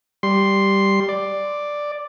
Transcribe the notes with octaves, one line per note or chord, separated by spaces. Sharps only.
G3 C6
D5